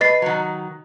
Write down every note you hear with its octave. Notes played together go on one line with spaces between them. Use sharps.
B4 D#5 A6 C7
D#3 F#3